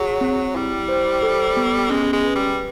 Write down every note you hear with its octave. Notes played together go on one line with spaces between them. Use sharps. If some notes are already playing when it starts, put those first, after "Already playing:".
Already playing: F#3 G#4
C4
G3 E4
C5
A4
B3
G#3 C#4
G#3
B4
G3